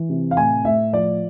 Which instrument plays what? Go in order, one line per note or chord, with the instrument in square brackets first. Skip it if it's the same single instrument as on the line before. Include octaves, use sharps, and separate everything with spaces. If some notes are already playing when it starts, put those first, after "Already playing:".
Already playing: [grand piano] E3
C3
F5
A2 G#5
A2 E5
F3 D5